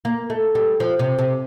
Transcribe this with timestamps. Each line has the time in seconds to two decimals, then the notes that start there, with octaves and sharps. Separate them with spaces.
0.05 A#3
0.30 A3
0.55 G3
0.80 F3
0.99 C3
1.19 C3